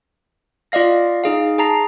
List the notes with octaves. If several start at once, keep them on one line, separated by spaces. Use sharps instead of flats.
F4 D5 D#5 F5 A#6
D#4 G#4 F5
G#4 A5 A#5 C7